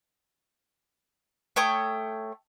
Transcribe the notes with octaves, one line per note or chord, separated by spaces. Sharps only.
A3 C#5 G5 D#6